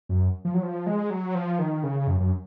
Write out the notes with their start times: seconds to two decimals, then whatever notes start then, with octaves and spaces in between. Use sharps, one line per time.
0.09 F#2
0.45 F3
0.54 F#3
0.63 F3
0.87 G#3
1.10 F#3
1.35 F3
1.59 D#3
1.83 C#3
2.07 F#2
2.20 F#2